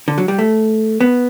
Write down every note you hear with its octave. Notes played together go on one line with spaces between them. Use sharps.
D3
F#3
G3
A3
B3